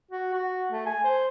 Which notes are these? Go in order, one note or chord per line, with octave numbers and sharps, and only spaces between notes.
F#4
F#4
A3
G#5
C5